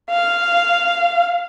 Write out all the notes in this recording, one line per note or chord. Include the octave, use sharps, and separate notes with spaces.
F5